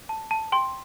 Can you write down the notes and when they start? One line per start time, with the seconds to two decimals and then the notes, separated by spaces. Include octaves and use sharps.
0.09 A5
0.31 A5
0.52 G5 C6